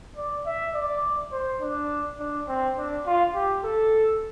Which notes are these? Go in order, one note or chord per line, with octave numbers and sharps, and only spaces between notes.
D5
E5
D5
C5
D4
D4
C4
D4
F4
G4
A4